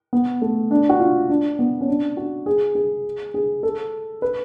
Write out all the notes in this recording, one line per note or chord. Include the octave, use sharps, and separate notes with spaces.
B3
A3
D4
F#4
F4
D4
B3
C#4
D4
F#4
G#4
G#4
G#4
A4
B4